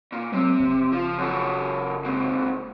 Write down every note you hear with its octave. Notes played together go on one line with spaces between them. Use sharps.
A#2
C3 F#3
F#1
F3
F#2 A4
G#2 C3